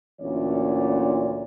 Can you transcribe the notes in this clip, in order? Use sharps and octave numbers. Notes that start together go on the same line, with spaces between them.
D2 A#2 E3 C#4 C#5 D5